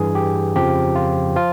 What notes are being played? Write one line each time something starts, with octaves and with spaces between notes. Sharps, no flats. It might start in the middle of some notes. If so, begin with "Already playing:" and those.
Already playing: G2 E3 G#4
G4
F2 C#3 F3 G4
F4
F3 F4